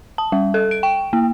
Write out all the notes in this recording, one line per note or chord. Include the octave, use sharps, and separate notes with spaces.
A5
G3
A4
D7
G5
A#3